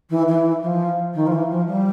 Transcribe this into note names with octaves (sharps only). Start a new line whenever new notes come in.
E3
E3
F3
D#3
F3
E3
F3
G3